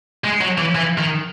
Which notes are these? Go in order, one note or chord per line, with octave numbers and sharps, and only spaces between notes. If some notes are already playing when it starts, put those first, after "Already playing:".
G#3
F#3
E3
E3
D#3